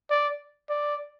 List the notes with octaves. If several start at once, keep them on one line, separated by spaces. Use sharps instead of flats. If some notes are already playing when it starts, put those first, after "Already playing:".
D5
D5